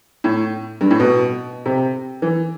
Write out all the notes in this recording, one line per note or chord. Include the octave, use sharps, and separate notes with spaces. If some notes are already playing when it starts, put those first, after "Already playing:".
A2
G2
A2
B2
C3
E3